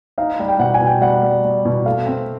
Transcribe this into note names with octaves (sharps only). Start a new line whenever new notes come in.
D#4 F5
G3
G5
B2 F#5
G#5
B2
G5
G3 F#5
G3
G3
B2
A3 F5
C4